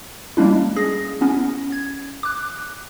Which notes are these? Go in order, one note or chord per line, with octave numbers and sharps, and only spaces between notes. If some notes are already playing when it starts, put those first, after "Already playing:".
G3 G#3 A#3 C#4 D4 E4
G#4 A#6
B3 C#4 E4
G#6
D6 F#6